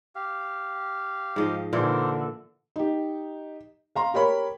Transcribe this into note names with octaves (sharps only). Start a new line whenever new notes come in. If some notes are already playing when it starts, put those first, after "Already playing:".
G4 F5
G#2 F3 D#5
A#2 D3 E3 A4 A#4 C5 D5
D#4 G4
F5 A#5 C6
G4 A#4 C#5 B5